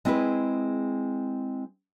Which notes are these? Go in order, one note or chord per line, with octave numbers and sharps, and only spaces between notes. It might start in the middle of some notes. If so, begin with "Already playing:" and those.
G#3 C4 E4 G#4 B4